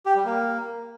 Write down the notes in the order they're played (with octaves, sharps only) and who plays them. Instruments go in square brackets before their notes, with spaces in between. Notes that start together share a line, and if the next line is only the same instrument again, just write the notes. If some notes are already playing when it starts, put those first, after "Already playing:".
[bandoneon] G4
G3
A#3